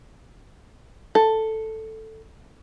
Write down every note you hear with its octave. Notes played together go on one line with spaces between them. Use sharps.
A4